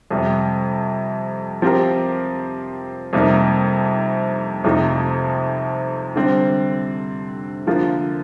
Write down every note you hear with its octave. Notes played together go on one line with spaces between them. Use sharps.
F2 C3 G3
F3 C4 G4 A#4
F2 C3 G3 A#3 D#4
F2 C3 F3 A3 D#4
D3 G3 C4
D3 F3 A#3 F4